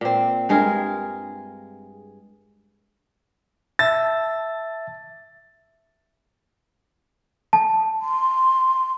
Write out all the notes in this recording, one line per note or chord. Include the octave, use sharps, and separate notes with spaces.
A#2 C4
G2 G#3 G#4 A#4
E5 A5 E6 A6
A5
C6